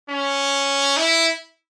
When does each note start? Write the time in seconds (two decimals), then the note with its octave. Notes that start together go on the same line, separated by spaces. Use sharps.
0.09 C#4
0.97 E4